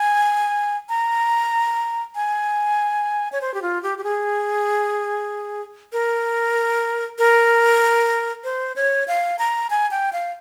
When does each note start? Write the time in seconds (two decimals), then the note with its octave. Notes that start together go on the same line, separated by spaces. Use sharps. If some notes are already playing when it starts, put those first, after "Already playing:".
Already playing: G#5
0.89 A#5
2.15 G#5
3.32 C#5
3.41 C5
3.54 G4
3.62 F4
3.83 G4
3.98 G4
4.04 G#4
5.93 A#4
7.19 A#4
8.44 C5
8.76 C#5
9.08 F5
9.39 A#5
9.70 G#5
9.91 G5
10.13 F5